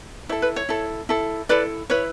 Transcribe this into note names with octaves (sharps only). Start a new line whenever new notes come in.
E4 A4 C#5
B4
C#5
E4 A4
E4 A4
E4 A4 B4 D5
E4 B4 C#5